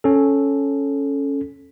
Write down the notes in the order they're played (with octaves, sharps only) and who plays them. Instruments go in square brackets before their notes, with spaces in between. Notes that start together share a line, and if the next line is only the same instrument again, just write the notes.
[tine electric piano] C#4 A4